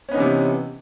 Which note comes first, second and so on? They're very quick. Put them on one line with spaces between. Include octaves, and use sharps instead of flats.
C#4 B3 D#4 E3 C3